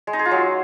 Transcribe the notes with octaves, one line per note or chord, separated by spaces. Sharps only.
G#3
D#4
G#4
F4
F#3